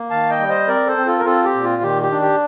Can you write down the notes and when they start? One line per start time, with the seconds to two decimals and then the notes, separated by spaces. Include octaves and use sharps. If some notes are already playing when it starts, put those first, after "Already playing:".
Already playing: A#3
0.10 D#3 F5 A5
0.29 D#5 G5
0.39 G3
0.49 C5 D#5
0.68 C4 A#4 D5
0.87 A4 C5
0.97 C4
1.06 F4 A4
1.18 A#4
1.25 C4 F4 A4
1.45 G4
1.54 A#2
1.63 F4
1.82 D#3 G4
2.03 G4
2.11 D4
2.22 G4